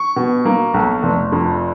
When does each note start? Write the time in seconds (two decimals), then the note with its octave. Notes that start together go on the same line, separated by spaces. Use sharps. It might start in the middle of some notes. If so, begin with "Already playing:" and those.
Already playing: C#6
0.16 B2
0.45 A#3
0.74 B1
1.03 F1
1.32 F2